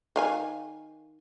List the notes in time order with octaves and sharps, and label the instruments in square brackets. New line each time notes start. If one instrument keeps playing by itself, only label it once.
[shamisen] D#3 F5 G#5